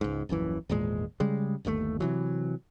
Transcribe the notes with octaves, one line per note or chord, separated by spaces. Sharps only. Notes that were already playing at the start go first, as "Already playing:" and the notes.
C#2 G#2
D#1 A#1 F#2 E3
G#1 E2 A#2 G#3
C#3 G3 G#3
G1 D#2 B2 A3
C3 E3 F#3